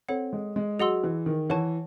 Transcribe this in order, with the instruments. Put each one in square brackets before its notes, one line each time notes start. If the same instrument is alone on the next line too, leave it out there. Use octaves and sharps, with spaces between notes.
[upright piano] C4 [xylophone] A4 C#5 F#5
[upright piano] G#3
G#3
[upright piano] F#3 [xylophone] G#4 D#5 F#5 C6 E6
[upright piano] E3
D#3
[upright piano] E3 [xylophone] C#5 F#5 A5 C#6